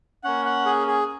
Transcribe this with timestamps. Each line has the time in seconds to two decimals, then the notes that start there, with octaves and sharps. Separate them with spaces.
0.24 A#3 C#4 F#5
0.45 F#5
0.66 G#4
0.87 G#4